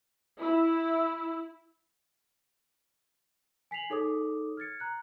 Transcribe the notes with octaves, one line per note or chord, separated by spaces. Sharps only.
E4
G#5 B6 C7 F7 F#7
D#4 G#4 A4 C#5 D6 D#6
F6 G#6 A6 C#7
A#5 F#6